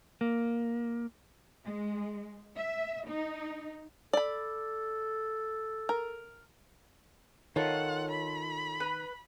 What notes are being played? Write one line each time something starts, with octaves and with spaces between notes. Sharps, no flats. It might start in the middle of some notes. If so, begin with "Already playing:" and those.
A#3
G#3
E5
D#4
A4 D5 B5
A#4
D#3 F4 A4 C#5 F#5
B5
B4